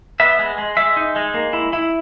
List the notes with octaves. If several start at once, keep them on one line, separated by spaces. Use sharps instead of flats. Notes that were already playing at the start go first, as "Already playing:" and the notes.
B3 E5
G#3
G#3
G#3 E5
D#4
G#3
A#3
E4
E4